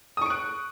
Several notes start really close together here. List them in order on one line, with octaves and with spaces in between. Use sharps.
D#6 C#6 D7 F#6